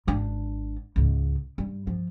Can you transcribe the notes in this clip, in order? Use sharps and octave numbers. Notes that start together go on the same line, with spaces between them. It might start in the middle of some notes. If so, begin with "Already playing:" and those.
G#1 D4
C#2 G#2
G2 G3
F3